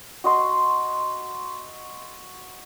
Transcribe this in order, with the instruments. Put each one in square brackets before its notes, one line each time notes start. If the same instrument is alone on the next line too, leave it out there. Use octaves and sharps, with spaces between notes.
[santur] F#4 D#5 C6